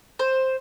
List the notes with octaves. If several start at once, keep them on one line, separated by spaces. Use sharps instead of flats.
C5